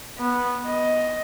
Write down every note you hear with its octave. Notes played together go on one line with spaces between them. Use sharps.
B3
D#5